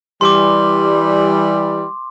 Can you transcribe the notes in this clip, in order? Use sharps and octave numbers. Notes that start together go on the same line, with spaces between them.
E3 G3 C6 D6